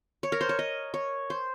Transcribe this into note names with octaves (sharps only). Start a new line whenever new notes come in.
C#5
A#4
C5
C#5
D#5
C#5
C5